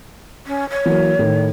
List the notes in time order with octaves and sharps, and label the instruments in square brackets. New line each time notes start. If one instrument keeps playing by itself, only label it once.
[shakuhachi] C#4
C#5
[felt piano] E3 F#3 A#3
A2 D#3